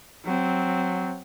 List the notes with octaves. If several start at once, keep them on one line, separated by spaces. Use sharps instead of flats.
F#3 C4